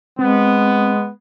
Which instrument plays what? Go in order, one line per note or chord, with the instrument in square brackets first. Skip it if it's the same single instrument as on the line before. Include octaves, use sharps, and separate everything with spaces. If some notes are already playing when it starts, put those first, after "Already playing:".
[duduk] G#3 [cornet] B3 [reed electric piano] C4